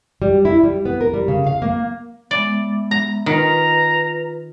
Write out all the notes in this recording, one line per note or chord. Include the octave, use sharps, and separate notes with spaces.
G3
E4
G3
B3
A#4
G3
C#3
F5
A#3
G#3 B3 D5 E5
A#5
D#3 F4 B4 A#5